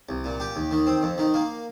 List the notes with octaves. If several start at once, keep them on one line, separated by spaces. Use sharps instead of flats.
C2
A#2
G4
D#2
D#3
C4
F2
D#3
A#3